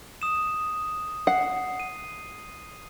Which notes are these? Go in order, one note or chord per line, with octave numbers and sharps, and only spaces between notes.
D#6 E7
F#5 C7
D#7